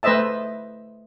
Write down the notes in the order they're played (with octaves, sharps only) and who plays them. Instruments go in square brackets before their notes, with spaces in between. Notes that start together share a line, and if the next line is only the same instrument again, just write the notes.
[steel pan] A3 B4 C5 D#5 E5 A5